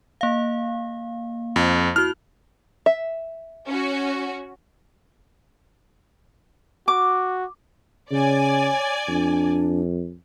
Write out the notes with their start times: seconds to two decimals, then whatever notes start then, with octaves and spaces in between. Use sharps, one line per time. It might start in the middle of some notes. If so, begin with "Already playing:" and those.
0.21 A#3 F5
1.56 F2
1.96 E4 F#4 F6
2.86 E5
3.67 C#4 F#4
6.88 F#4 D6
8.11 C#3 C#5 D5 G#5
9.08 F2 D4